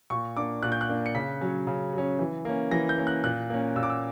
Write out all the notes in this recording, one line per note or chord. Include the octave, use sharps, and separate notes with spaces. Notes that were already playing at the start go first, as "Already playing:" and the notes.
A#2 C#6
A#3 D4 D6
A#2 F#6
G6
F#6
A#3 D4
C#7
C#3 B6
F#3 C#4
C#3
F#3 C#4
E3
A#3 C#4
E3 A#6
G6
A#3 C#4
F#6
A#2 F#6
A#3 C#4
A#2 E6
D6
E6